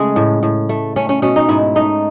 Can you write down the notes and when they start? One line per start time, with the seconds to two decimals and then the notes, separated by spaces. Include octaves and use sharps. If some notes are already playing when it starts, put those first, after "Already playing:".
Already playing: C#3 G#3 A3 G#4
0.16 A2
0.43 A2
0.69 A3
0.96 A3 C#4
1.09 C#4
1.22 B2 C#4
1.36 D#4
1.49 G#2 E4
1.75 A3 D#4